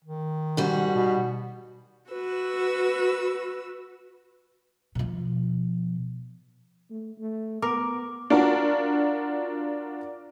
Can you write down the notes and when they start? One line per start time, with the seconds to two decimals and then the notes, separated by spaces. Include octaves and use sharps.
0.04 D#3
0.57 G#2 G3 F#4
0.94 B2
2.11 F#4 B4 E6
4.95 B2 F3
6.90 A3
7.18 A3
7.62 B3 A#4 D6
8.30 D4 F4 F#4 A#4